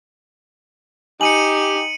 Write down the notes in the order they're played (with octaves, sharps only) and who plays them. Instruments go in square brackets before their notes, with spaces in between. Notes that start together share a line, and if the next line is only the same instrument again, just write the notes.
[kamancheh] D#4 [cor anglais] G4 [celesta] G#5 [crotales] C#7 D#7 F#7